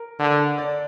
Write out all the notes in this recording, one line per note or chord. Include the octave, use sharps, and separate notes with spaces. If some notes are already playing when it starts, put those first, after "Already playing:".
Already playing: A#4
D3
D5